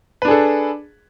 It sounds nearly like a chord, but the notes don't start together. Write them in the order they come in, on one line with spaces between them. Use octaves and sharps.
B4 D4 G#4 A4